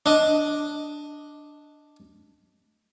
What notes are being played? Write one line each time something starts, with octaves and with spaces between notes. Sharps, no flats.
D4 D#5